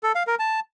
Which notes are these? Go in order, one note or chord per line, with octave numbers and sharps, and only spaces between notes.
A4
F5
A#4
A5